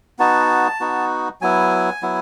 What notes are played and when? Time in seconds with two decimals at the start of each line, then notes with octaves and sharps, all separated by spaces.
0.19 B3 D#4 F#4 A5
0.80 B3 D#4 F#4
1.41 F#3 B3 E4 G#5
2.02 F#3 B3 E4